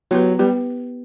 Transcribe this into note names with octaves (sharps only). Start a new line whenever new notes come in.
F#3 B3 E4 G4 B4
G3 B3 G4 B4